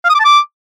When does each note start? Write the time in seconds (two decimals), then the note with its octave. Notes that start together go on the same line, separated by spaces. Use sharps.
0.04 F5
0.09 D#6
0.15 D6
0.20 A5
0.25 D6